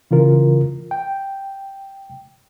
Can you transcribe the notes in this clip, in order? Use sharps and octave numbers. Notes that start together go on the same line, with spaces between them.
C#3 E3 F4 A#4
G5